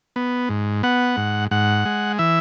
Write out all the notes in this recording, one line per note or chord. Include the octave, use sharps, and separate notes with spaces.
B3
G#2
B3 F#5
G#2
G#2 F#5
G#3
E3 E5